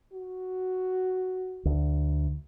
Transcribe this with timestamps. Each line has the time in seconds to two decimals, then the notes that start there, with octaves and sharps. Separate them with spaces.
0.13 F#4
1.65 D2